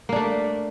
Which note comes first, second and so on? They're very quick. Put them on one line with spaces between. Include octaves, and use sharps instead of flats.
A#3 D4 A3